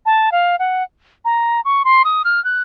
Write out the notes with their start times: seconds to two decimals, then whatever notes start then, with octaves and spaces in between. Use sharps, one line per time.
0.06 A5
0.32 F5
0.59 F#5
1.25 A#5
1.65 C#6
1.85 C6
2.05 D#6
2.25 F6
2.44 F#6